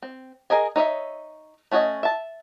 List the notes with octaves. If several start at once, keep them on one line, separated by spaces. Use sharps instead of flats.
C4
G#4 A#4 D#5 G#5
D#4 C#5 D#5 E5
A3 C#4 F#4 C#5 D#5
E5 A5